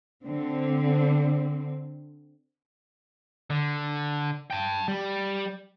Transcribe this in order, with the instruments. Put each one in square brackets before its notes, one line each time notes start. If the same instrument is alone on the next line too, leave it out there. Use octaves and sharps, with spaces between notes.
[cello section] D3 C4
[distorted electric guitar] D3
G5 A5
G3